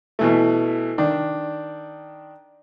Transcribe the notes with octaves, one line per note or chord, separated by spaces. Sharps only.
B2 E3 A3
D#3 D4